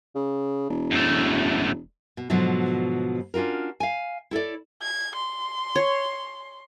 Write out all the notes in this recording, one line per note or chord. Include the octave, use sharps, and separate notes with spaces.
C#3
E1
F#2 A3
B2
G#2 B2 D3 F3 F#3
C#4 D4 F4 F#4 A#4
F5 G#5
E4 A4 C#5 D5
G#6
C6
C#5